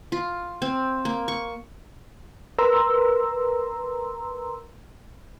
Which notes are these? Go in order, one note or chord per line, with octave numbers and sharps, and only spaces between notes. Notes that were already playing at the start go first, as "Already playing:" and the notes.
F4
C4
A#3
C#6
A#4 B4 A#5 C6 E6